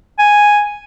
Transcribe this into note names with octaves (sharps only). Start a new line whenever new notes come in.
G#5